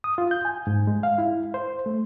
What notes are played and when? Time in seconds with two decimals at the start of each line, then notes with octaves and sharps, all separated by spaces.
0.04 D#6
0.18 F4
0.31 G6
0.45 G#5
0.67 G#2
0.87 G#3
1.03 F5
1.18 E4
1.54 C5
1.86 A3